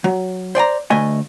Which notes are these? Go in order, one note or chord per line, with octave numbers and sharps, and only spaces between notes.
F#3
C5 D5 G#5 A#5
D2 A3 D#5 G#5